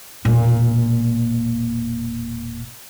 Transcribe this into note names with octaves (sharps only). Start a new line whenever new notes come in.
E1 A#2